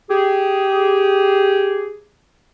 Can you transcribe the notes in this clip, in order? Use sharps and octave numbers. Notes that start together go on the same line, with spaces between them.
G4 G#4